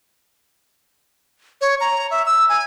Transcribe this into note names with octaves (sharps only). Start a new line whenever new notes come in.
C#5
A#5
E5
E6
G#5